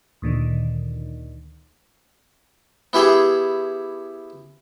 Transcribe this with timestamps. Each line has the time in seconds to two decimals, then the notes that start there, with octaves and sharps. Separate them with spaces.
0.22 D2 A#2 D3 D#3
2.93 B3 E4 G4 G#4